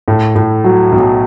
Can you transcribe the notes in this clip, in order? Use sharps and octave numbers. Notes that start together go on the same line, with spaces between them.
A2
A2
F#3
B1